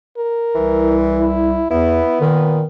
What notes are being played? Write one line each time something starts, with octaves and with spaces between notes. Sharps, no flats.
A#4
C2 E3
E4
E2 B3 E4
A#2 D#3